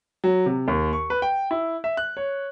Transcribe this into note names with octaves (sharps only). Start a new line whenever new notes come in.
F#3
C3
D#2
C#6
B4
G5
E4
E5
F#6
C#5